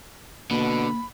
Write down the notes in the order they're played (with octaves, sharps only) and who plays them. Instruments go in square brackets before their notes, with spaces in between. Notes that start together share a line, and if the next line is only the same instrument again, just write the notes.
[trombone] B2 [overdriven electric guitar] D3 [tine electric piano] A#3 [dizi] B5